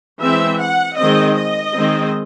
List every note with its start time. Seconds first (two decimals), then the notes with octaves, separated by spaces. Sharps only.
0.20 E3 G#3 C4 E5
0.60 F#5
0.98 D#3 G#3 C4 D#5
1.37 D#5
1.76 D#3 G#3 C4